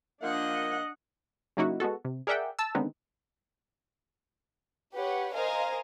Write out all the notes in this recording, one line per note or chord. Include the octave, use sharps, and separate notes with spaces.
F3 A#3 D4 D#5 F#5
C#3 F#3 A#3 D#4 E4 F#4
G#3 B3 F#4 A4
C3
G#4 A#4 D5 E5 F#5 G5
A5 E6
D3 D#3 G#3 B3 C4 D#4
G4 B4 C#5 F#5
A#4 C5 D#5 F5 G#5